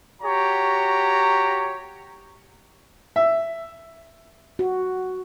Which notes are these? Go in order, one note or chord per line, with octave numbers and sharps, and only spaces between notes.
F#4 G4 C#5 A#5
E5
F#4